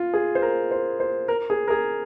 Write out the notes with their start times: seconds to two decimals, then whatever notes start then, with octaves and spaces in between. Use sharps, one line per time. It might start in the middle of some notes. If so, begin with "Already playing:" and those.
Already playing: F4
0.14 G#4
0.35 C5
0.42 A#4
0.71 C5
1.00 C5
1.28 A#4
1.50 G#4
1.68 A#4
1.70 G#4